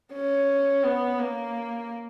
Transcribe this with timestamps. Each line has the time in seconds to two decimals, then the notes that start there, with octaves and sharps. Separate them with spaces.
0.13 C#4
0.84 B3
1.19 A#3